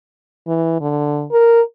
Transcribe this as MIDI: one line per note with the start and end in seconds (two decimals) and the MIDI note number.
0.47 0.80 52
0.81 1.26 50
1.31 1.61 70